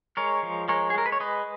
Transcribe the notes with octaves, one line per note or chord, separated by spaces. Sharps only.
G#3 A#4 C#5
F3
G#3 A#4 C#5
G#4
G#3 A#4
B4
C#5
G#3 B4 D#5